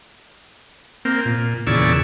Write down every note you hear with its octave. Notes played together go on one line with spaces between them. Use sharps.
A#3 C4
A#2
E2 A#2 C#3 D5 C#6 E6